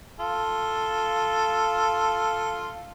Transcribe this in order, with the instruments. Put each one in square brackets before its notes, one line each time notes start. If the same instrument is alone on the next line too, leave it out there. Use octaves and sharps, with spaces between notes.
[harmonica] F4 A4